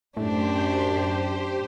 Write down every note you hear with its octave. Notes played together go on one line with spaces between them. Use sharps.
F#2 A2 D4 G4 C5